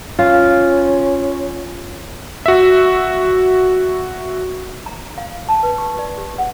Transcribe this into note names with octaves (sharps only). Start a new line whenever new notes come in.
C#4 F4
F#4 E5
A#5
F5
A5
B4
C#6
D5
G4
F#5